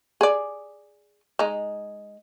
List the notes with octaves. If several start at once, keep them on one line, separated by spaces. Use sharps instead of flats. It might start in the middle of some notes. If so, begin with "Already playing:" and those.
G#4 D5
G#3 D#4